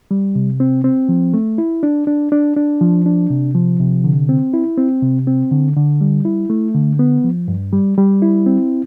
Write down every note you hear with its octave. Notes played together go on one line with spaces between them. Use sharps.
G3
C3
C4
C4
F3
A3
E4
D4
D4
D4
D4
F3
D4
C3
F3
C3
D3
C4
E4
C4
C3
C4
D3
D3
G3
E4
A3
D3
B3
F3
G2
G3
G3
E4
C4